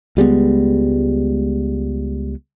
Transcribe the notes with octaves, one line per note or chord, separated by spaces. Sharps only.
C#2 G3 G#3 B3